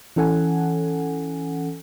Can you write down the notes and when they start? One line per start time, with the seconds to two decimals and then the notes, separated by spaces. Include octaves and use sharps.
0.16 E3 C#4 A4 F#5 G#5